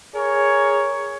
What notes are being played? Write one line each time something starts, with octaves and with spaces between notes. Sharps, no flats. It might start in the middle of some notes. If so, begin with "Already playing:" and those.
G#4 A#4 C#5